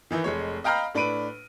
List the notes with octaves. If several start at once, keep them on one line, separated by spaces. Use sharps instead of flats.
D#3 E3 D#4 E4
F1 G#3 C#5
D#5 F5 G5 A#5 B5 F6
A2 D4 B4 B5 D7 D#7